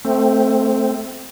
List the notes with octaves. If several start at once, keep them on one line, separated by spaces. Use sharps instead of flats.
A3 C4